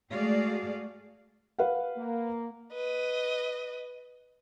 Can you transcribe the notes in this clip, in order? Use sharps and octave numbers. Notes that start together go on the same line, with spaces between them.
G#3 A3 F#4 G#4 D5 F5
B4 F5 F#5
A#3
B4 D#5